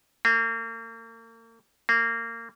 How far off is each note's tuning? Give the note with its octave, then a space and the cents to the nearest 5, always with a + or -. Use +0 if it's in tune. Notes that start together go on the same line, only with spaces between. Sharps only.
A#3 -40
A#3 -25